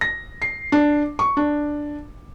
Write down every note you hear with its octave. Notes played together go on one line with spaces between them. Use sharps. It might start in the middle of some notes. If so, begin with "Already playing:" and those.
A#6
C7
D4
C#6
D4